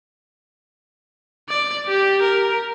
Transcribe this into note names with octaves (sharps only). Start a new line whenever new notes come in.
D5
G4
A#4